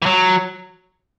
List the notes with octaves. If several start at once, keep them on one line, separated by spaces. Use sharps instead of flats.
E3
F#3